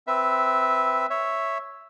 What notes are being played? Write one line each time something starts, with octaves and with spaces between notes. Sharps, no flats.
C4 B4 E5
C#5 E5